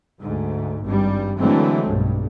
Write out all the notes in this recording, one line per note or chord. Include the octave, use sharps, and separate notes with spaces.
D2 G#2
G#1 G2 G3
D3 E3 F#3 G#3 A3 C4
B1 G2